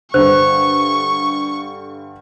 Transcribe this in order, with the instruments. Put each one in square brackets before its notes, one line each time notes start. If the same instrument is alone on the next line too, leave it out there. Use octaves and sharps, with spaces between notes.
[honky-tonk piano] G2 D3 [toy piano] C5 [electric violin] C#6